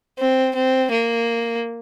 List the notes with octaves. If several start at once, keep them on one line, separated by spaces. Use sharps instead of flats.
C4
C4
A#3